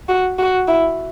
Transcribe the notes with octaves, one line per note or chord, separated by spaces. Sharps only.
F#4
F#4
E4